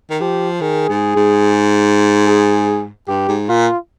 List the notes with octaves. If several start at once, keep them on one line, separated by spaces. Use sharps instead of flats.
D#3
F3 G4
D#3 G#4
G#2
G#2
G#4
G2 G4
G#2
A#2 F4